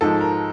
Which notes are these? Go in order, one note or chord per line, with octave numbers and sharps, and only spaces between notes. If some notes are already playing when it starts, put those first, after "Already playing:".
G#2 F3 G#3 A4
A#4